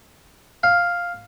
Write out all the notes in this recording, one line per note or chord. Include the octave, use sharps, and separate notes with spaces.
F5